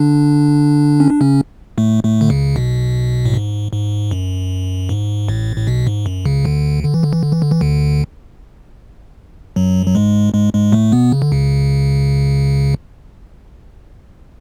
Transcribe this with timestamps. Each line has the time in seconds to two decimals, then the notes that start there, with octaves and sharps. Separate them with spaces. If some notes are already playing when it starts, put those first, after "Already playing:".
Already playing: D3 D4
1.00 C#4
1.11 D4
1.21 C#3 C#4
1.78 A2 A3
2.04 A2 A3
2.21 D3
2.30 C#2 C#3
2.56 B1 B2
3.25 A2
3.34 G#2
3.73 G#2
4.11 F#2
4.89 G#2
5.28 A1 A2
5.57 A2
5.67 B1 B2
5.87 G#2
6.06 F#2
6.25 C#2 C#3
6.45 D2 D3
6.84 D3
6.94 E3
7.03 D3
7.13 E3
7.23 D3
7.32 E3
7.42 D3
7.51 E3
7.61 D2 D3
9.56 F#2 F#3
9.87 F#3
9.95 G#2 G#3
10.34 G#2 G#3
10.53 G#2 G#3
10.72 A2 A3
10.92 B2 B3
11.12 C#3
11.22 D3
11.32 C#2 C#3